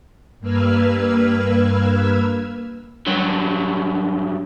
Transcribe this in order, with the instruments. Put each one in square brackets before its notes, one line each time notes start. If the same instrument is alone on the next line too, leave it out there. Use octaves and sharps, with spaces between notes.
[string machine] G2 A#3 B4 E6 F6 G#6
[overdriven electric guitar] G2 F#3